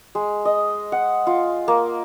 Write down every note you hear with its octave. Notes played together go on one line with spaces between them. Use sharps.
G#3
D#5
F#5
F4
A#3